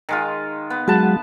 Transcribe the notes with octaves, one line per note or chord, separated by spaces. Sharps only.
D#3 G#3 F4
B3
F#3 G#3 B4 F#5 A5